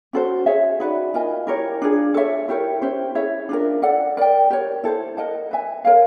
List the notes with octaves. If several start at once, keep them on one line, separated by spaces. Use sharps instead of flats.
C#4 F#4 A4 C5
G#4 C#5 E5
D#4 F#4 B4 D5
F4 A#4 D#5 G#5
E4 G4 A#4 C#5
D4 F4 G#4
A4 C#5 E5
E4 G4 A#4 C#5
C#4 E4 G4 C5
E4 G#4 C#5 E5
D4 F4 A#4
A4 D5 F#5
A#4 D5 G5
G4 A#4 C#5
E4 A4 C5
A#4 D#5 F#5 A5
B4 E5 G#5
A#4 C#5 F5